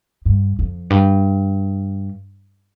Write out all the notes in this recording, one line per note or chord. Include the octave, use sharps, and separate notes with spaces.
G2
F2
G2